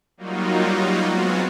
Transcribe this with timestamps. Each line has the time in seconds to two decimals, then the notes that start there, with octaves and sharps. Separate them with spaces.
0.17 F#3 G3 A#3 D#4 F4 F#4
1.08 F#3 G#3 B3 C4 F4 F#4